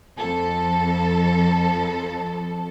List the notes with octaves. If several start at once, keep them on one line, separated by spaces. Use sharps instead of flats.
F2 A4